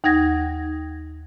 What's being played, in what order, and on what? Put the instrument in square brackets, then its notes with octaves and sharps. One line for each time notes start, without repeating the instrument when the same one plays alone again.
[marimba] D#2 D#4 F#5 G#6 A#6